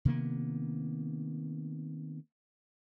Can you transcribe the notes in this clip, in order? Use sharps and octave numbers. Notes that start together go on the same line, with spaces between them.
C3 D#3 A#3 B3